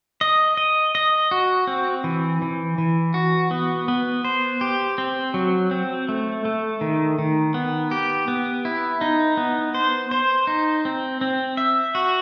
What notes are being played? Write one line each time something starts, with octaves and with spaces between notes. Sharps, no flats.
D#5
D#5
D#5
F#4
C4
E3
E3
E3
F#4
B3
B3
C5
G4
C4
F#3
C4
A3
A3
D#3
D#3
B3
G4
B3
E4
D#4
B3
C5
C5
D#4
C4
C4
E5
F#4